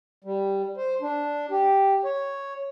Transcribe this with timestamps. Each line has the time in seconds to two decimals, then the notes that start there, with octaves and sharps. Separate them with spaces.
0.24 G3
0.77 C5
1.01 D4
1.51 G4
2.04 C#5